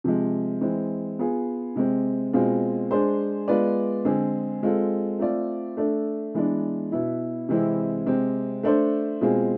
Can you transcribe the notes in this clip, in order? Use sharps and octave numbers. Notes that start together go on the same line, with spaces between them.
C3 F3 G#3
E3 G#3 C4
B3 F4 G#4
C3 G#3 C4
B2 G#3 C4 F4 G#4
G#3 D4 G#4 C5
G#3 B3 F4 B4 D5
D3 G#3 C4 G#4
G#3 C4 F4 A4
A3 C4 F4 A4 D5
A3 D4 A4
E3 G#3 B3 D4
B2 B3 E4
C3 E3 G#3 C4 E4
C3 G#3 C4
A3 D4 A4 C5
B2 G#3 C4 F4 G#4